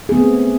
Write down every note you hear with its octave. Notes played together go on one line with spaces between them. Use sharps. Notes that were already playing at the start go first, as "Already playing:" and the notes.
A3 B3 C4 G#4